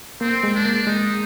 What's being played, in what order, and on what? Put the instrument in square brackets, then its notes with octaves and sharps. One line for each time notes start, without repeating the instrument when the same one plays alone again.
[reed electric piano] A#3 [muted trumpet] C4
[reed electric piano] G#3
[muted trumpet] D4
[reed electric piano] A#3
[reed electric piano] G#3 [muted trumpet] D#4